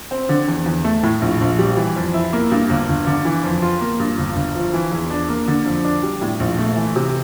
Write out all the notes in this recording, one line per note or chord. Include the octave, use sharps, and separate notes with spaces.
C4
D3
E2
E2
A3
A2
A#1
A#1
G3
E3
F2
E4
A#3
G2
G1
G1
D3
E3
F2
F4
A#3
G2
G1
G1
F3
E3
E2
D4
A#3
D3
F2
D4
G3
A2
A#1
A3
E3
C3